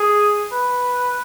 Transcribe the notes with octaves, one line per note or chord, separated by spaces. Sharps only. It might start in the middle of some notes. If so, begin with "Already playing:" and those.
Already playing: G#4
B4